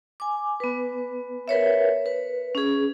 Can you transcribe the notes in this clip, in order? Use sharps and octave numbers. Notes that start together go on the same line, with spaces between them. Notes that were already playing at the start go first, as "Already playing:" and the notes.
G#5 D6
B3 B4
A#4 B4 C#5 E5
B4
C#4 G#4